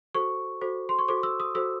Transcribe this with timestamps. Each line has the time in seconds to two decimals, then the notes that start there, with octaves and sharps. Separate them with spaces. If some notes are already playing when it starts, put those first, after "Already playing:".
0.15 F#4 A4 C5 C#6
0.61 F#4 A4 C5
0.89 C6
0.99 C#6
1.08 F#4 A4 C5 D6
1.23 E6
1.40 D#6
1.55 F#4 A4 C5 E6